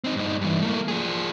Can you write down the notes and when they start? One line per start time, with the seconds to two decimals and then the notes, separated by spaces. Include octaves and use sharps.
0.04 C4 D#4
0.16 G2 D#4
0.41 G2 E3
0.62 A3 A#3
0.88 F3 G#4